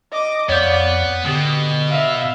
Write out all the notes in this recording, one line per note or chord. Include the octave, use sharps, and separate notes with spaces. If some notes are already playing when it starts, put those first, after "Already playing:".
D#5 D6
F2 B3 C#5 D5 F5 G6
B2 D3 G4 D#6
E5 F5